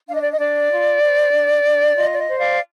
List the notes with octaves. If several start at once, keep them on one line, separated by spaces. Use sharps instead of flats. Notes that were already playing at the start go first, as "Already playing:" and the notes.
D4 F5
D#5
D5
D#5
D4 D5
F4
C5
D4
D4
F4 D#5
D5
D#5
C5
D5 F5